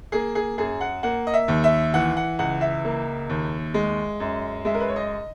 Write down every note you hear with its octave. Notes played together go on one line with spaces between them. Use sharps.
A#3 G#4
G#4
F#2 G#4
F#5
A#3 F#5
D#5
E5
D#2
E5
E3 F#5
F#5
C#2 F#5
E5
A#3
D#2
G#3
F#2
G#3 E5
A#4
B4
C#5
D#5